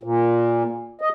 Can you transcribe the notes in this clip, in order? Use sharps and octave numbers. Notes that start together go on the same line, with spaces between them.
A#2
D#5